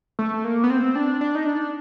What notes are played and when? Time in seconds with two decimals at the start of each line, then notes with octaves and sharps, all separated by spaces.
0.19 A3
0.44 A#3
0.64 B3
0.70 C4
0.95 D4
1.21 D4
1.35 D#4
1.46 D4